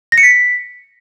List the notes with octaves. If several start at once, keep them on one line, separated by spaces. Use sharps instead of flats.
A#6
C#7
B6